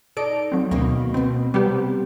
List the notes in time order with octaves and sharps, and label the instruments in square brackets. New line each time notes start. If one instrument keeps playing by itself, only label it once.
[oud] D#4 D5 [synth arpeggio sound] A4 D7
[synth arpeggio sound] F#3 C4
[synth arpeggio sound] D2 [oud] B2 D#3 A#3
[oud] B2 B3 [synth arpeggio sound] C4
[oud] C3 [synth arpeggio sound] G3 B3 G4